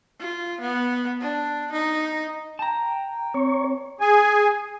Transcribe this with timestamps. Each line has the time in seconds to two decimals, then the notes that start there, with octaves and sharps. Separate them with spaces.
0.20 F4
0.60 B3
1.21 D4
1.72 D#4
2.59 G5 A5 A#5
3.34 C4 C#5
4.01 G#4 G#5